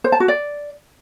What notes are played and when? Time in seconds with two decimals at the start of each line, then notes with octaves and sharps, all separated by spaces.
0.04 C5
0.12 A5
0.20 F#4
0.28 D5